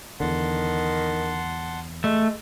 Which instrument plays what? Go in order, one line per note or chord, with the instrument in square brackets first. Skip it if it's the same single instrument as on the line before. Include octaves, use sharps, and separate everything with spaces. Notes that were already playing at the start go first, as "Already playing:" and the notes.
[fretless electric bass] E2 D3 [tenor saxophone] D#3 [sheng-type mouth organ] F#5 A5 C6
[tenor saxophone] G#3 [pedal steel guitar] A3